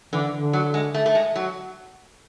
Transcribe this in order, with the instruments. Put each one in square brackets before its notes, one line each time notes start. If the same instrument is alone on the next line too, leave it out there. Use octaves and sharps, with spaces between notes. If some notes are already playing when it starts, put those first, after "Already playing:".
[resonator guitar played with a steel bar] D3 [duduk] E3
[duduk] D3
[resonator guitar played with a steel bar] F#3
G#3
A3
A3
G#3
F#3